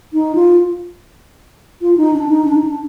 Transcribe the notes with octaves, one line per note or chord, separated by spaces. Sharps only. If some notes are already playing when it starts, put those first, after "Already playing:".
D#4
F4
F4
D#4
D4
D#4
D4
D#4
D4